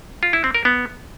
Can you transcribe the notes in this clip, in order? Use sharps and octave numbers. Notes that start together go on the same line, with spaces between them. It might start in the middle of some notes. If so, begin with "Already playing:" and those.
F4
E4
C4
A#4
B3